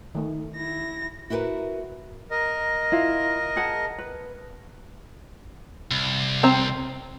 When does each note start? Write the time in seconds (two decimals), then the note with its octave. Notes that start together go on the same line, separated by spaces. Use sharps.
0.15 D#3 A3 D#4
0.56 E4 A#6
1.30 E4 F#4 G4 A#4 B4
2.31 A#4 D#5
2.92 E4 F4 F5
3.56 G#4 F#5 A5
3.98 B4
5.91 C2
6.43 C4 A#5